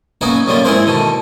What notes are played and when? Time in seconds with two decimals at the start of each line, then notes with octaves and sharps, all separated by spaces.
0.21 F#3 A#3 B3 C#4 D#4 F#4
0.46 F#2 C#3 G3 A#3 F4
0.64 G#2 C4 E4 G#4 A#4 C5
0.87 B2 D3 D#3